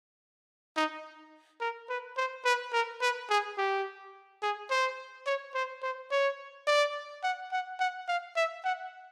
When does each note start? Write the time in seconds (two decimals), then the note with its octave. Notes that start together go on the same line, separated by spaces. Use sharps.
0.76 D#4
1.60 A#4
1.89 B4
2.17 C5
2.45 B4
2.73 A#4
3.01 B4
3.30 G#4
3.58 G4
4.42 G#4
4.70 C5
5.26 C#5
5.54 C5
5.82 C5
6.11 C#5
6.67 D5
7.23 F#5
7.52 F#5
7.79 F#5
8.08 F5
8.36 E5
8.64 F#5